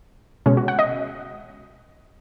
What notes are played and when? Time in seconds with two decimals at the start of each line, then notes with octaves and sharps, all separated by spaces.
0.46 B2 G#3 C#4
0.57 F#4
0.68 F#5
0.79 D#5